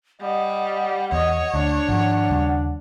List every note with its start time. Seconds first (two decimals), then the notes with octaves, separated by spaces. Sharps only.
0.21 G3 D#5 F#5
1.12 E2 C#5 D#5
1.54 D2 D4
1.88 G#1 F3 F#5
2.30 D#2 C#3 G3